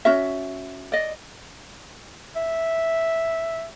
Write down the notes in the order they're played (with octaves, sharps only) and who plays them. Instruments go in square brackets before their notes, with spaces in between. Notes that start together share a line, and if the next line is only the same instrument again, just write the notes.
[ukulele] C#4 F#4 E5
D5 D#5
[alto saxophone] E5